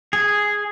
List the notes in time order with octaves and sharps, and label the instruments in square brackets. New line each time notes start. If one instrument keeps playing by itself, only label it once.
[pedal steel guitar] G#4